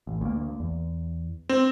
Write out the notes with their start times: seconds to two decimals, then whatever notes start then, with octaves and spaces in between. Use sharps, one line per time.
0.07 A1
0.21 D2 A#3
0.60 E2
1.49 C4